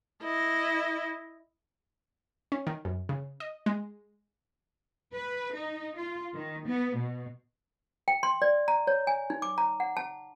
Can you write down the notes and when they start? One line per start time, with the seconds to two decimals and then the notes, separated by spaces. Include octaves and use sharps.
0.23 E4 D#5
2.52 C#4
2.67 D#3
2.85 F#2
3.09 C#3
3.40 D#5
3.66 G#3
5.14 B4
5.54 D#4
5.98 F4
6.34 D#3
6.67 B3
6.96 B2
8.08 G5
8.23 C6
8.42 D5
8.68 A#5
8.87 C#5
9.07 G#5
9.30 D#4
9.42 D6
9.58 A#5
9.80 F#5
9.97 A5